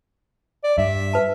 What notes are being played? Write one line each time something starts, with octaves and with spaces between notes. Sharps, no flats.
D5
G2 E5
B4 A5